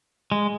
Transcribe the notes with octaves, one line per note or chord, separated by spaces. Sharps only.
G#3